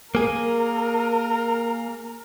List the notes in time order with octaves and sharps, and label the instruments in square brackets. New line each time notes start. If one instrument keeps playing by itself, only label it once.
[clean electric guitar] A#3 G#4 [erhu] A#4